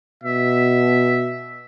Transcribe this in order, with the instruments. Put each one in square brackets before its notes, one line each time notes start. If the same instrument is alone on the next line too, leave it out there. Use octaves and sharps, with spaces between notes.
[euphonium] B2 [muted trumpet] E5